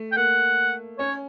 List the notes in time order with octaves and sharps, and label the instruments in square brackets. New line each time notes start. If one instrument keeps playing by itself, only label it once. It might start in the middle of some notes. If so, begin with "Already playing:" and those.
Already playing: [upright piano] A3
[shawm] G5
[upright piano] A#3 [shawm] F#5
[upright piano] C#4 [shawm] C#5